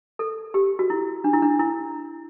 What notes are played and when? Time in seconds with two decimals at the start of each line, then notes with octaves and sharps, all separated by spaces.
0.19 A4
0.54 G4
0.79 F#4
0.90 E4
1.24 D4
1.33 E4
1.42 D4
1.59 E4